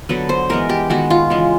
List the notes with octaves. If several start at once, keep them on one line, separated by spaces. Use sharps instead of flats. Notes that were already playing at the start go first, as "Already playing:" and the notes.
D3 F#3 B3 B4
C5
E3 G#3 B3 A#4
G4
D#3 G#3 B3 F#4
F4
C#3 E3 G#3